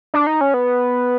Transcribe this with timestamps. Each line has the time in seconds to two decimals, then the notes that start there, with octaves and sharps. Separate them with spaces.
0.14 D4
0.27 D#4
0.41 C#4
0.54 B3